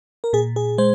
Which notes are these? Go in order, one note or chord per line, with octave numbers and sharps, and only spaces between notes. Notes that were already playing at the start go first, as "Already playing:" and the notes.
A#4
A#2 G#4
G#4
G#3 C5